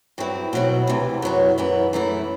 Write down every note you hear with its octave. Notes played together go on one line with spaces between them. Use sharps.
G2 F#3 C4 E4
B2 F#3 C4 E4
D2 C3 E3
F#2 F#3 B3
F#2 E3 B3 E4
F#2 E3 A3 E4